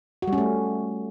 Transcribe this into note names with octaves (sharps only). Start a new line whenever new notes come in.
F#4
G3
C#4
A3